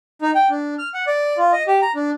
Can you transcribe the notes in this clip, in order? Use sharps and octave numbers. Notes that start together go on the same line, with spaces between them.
D#4
G5
D4
F6
F#5
D5
F4
D#5
G4
A#5
D4